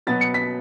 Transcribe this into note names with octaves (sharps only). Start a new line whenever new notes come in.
B2 F#3 B3 A6
C#7
B6